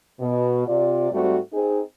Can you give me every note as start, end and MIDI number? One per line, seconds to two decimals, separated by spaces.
0.19 0.62 47
0.67 1.10 48
0.67 1.10 65
0.67 1.10 74
1.12 1.37 44
1.12 1.37 55
1.12 1.37 57
1.12 1.37 60
1.12 1.37 66
1.53 1.80 60
1.53 1.80 63
1.53 1.80 68